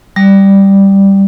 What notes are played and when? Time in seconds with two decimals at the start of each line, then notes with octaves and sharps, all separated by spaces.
0.16 G3